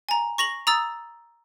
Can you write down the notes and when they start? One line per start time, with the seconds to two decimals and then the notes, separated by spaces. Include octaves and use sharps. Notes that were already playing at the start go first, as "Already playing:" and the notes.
0.09 G#5 A#5
0.38 C#6 A#6 F7 F#7
0.67 A#5 D#6 E6 A6